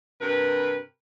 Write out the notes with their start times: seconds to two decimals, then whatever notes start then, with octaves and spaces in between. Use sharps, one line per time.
0.21 G2 C3 A#4 B4